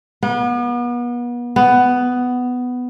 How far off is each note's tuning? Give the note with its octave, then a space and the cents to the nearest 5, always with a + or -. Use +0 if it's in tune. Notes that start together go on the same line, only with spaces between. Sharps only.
B3 -35
B3 +10